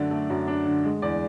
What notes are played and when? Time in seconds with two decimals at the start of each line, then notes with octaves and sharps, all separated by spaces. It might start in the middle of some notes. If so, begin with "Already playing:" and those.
Already playing: F#2 D3 A3 D4 D5
0.11 A3
0.30 F#2
0.47 D4
0.66 D3
0.84 G#3
1.02 E2 D5